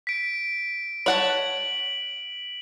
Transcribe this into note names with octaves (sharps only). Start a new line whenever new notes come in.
B6 D7
C#5 F#5 A5 F#7